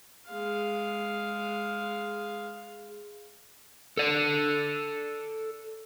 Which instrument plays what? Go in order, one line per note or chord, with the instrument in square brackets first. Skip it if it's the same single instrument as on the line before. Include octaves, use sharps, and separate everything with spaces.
[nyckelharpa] G#3 F5
[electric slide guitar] A4 D5